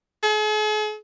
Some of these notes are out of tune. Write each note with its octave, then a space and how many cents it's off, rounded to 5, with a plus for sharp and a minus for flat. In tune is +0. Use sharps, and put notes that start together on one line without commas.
G#4 +45